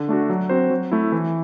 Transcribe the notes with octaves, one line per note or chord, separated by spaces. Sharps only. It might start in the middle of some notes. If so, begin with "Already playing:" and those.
Already playing: D3
A3 D4 F#4
F#3
C4 F#4 C5
F#3
A3 E4
E3